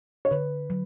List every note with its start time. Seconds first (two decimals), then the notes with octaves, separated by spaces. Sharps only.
0.25 C#5
0.31 D3 B4
0.70 F#3